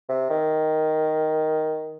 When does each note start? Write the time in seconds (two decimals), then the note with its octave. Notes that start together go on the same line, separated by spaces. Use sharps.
0.09 C3
0.30 D#3